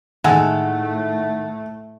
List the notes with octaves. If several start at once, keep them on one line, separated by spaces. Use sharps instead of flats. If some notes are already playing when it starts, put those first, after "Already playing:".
A2 D#3 G#3 A3 A4 F#5